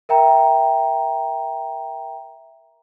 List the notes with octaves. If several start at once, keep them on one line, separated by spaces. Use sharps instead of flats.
A#4 E5 G5 A#5